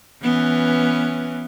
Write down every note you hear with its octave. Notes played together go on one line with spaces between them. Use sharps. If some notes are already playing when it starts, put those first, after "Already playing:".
E3 B3 C#4